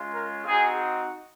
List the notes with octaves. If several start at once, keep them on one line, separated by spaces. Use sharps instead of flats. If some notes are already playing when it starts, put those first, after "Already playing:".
Already playing: G#3 C#4 F4
A#4
C4 D#4 F#4 G#4